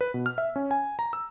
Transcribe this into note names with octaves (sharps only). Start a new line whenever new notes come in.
B4
B2
F6
E5
C#4
G#5
A#5
E6